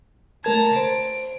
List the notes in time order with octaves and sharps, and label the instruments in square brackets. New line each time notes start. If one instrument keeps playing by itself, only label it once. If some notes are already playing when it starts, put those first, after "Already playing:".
[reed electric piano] A3 A#4 G#6 [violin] A5 A#5
[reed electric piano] C5 [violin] D7